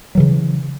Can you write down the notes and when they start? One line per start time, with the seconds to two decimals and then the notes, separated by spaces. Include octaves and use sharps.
0.15 F#3
0.17 E3
0.20 C#3